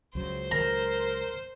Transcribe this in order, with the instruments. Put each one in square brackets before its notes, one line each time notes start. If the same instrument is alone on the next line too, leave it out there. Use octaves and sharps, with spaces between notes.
[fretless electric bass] C#2 F#3 [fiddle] C5
[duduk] A#4 [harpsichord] A#5